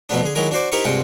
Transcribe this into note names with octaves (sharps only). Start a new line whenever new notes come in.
F2 B2 F#3 A3 B3 D4
D3 G#4
D#3 F#3 G#3 E4 A#4
D4 F#4 C5 D5
D#4 E4 G4 A#4 C5 C#6
C2 G2 G#3 F4 F#5 G5